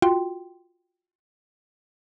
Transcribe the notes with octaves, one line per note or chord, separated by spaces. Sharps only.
F4 F#4 G5 C6